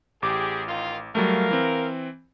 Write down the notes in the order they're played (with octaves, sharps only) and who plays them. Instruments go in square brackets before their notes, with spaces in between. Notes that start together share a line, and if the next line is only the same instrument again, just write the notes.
[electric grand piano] A1 D6 [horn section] G4 G#4
[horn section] D#3 F4
[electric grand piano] F#3 G3 A3 [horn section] A#4 F5
[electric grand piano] E3 C4